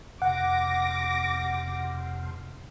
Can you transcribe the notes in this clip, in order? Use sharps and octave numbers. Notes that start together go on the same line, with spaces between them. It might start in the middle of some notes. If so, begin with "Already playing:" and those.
F2 C3 F#5 D6 A#6